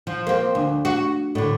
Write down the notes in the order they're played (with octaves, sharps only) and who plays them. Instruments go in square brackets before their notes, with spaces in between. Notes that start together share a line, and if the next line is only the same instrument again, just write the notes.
[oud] F3
A#3 C4
D2
F#4
A2 D3